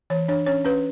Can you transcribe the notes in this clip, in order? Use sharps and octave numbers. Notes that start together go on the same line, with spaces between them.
E3 C#5
D4 C#5
C#4 C#5
C#4 B4